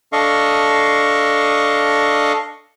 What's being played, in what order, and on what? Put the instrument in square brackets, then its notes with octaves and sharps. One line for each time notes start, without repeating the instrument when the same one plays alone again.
[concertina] D4 A4 D#5 F5 C#6